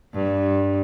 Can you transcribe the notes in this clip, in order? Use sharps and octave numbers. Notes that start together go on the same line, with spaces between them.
G2